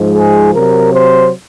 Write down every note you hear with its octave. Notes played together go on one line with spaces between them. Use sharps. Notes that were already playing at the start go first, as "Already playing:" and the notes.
Already playing: G#2 F3 G#3
G#4
C3 F#3 A#4
C5